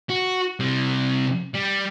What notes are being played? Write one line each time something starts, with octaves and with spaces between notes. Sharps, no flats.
F#4
C3 G3
G3